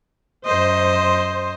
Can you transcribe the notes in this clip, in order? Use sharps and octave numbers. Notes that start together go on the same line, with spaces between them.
F#2 C5 D#5